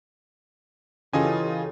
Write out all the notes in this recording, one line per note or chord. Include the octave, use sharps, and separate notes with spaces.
C#3 E3 F4 G4 A4 C#5 D#5 G#5